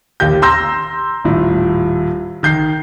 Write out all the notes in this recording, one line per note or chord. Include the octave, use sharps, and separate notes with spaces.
D#2 G4 G6
A#5 C6 E6 G6 A#6
D#1 A2
D#3 G6 C7